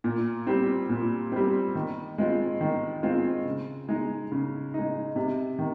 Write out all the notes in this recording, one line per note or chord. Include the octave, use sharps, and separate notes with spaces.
A#2
G3 C4
A#2
G3 C4
D#3
G#3 C4 F4
D#3
G#3 C4 F4
C#3
G#3 D#4
C#3
G#3 D#4
C3
D#3